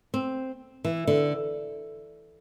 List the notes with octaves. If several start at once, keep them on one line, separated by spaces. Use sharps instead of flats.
C4
E3
D3